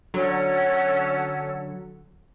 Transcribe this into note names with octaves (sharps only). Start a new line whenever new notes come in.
D3 F#3 C#4 A4 F#5